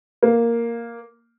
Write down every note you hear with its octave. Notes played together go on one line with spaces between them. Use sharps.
A#3